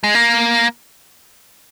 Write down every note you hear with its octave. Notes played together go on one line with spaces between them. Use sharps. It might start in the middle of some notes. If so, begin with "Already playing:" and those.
G#3
A#3